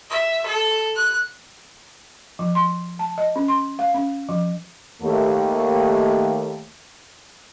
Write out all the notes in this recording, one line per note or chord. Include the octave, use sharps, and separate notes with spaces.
E5
A4
F#6
F3
C6
A5
D#5
C#4
C6
F5
C#4
F3
D#2 A3